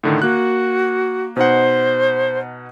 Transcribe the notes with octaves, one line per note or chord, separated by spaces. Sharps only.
A2 D3 D#3
A#3 F#4 F#6
B2 D#4 C5 F#5